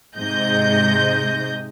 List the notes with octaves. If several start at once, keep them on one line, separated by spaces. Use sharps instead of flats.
G#2 C3 G#3 D#5 G6 A#6